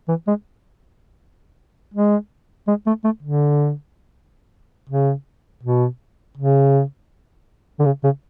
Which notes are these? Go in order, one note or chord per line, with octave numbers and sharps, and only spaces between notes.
E3
G#3
G#3
G#3
A3
A3
D3
C#3
B2
C#3
D3
C#3
C#3